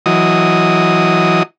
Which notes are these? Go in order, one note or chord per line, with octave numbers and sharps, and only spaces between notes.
E3 F#3 D#5 D#6